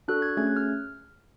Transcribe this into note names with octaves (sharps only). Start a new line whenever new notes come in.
D4 F#4 A4 F#6
G#6
A3 C#4 G#4 G#6
F#6
F6